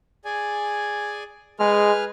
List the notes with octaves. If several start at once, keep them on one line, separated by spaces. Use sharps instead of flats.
G#4 D5 G#5
G#3 G#4 B4 F6